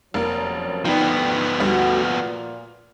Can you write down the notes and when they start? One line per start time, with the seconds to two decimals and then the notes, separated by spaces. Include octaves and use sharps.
0.14 F1 F#2 F3 A#3 A#4 C#5
0.85 D2 F3 B3 D#4 D5 G5
1.60 D2 G3 A3 F#4
2.04 A#2 F6